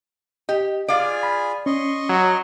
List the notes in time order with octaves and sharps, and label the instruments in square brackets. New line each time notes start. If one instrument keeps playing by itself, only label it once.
[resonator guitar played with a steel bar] G4 [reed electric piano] D#5
[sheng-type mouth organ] F4 G#4 G#5 [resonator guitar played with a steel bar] D5 F5
[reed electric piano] B5
[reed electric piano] C#4 [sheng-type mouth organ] D#5 C6 C#6
[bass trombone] F#3